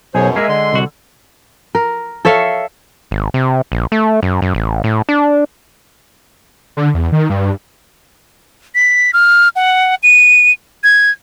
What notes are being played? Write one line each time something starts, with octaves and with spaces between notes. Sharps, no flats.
B1 F#2 B2 G#4 C5 C#5
G#3 A#3 D#5 E5 G#5
D3 C6
C2 F#4
A#4
A4 C#5 E5 F5
G#1
C3
A#1
A3
F#2
F#2
A1
A2
D4
D3
E2
D#3
G2
B6
F6
F#5
D#7
G#6